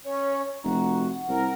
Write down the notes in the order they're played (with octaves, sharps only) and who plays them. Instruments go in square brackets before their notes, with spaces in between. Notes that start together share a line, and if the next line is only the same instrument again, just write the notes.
[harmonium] C#4 [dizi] C#5
[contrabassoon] F1 [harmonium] F#4 [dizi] A#5
[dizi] F#5
[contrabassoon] C2 [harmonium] A#4